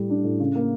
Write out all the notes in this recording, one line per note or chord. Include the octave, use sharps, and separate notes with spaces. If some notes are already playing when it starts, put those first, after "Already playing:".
Already playing: A2 G3
D4
A2
C#3
A#3